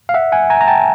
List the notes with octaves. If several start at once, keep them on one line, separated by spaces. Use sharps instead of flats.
F5
E5 F#5
F#5 G#5
G#5 A#5
A#5
G5 A5